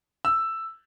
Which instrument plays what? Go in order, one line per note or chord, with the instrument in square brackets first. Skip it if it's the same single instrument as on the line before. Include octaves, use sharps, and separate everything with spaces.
[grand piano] E6